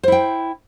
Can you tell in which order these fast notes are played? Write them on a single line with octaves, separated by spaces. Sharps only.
C5 E4 G5